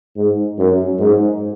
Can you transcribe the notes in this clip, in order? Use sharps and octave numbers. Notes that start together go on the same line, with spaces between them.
G#2
F#2
G#2